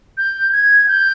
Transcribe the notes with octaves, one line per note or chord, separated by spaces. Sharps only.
G6
G#6
G6